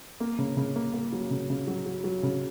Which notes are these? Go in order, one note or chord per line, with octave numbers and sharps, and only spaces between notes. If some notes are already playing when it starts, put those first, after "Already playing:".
A#3
C#3
C#3
A#3
A#3
F#3
C#3
C#3
F#3
F#3
F#3
C#3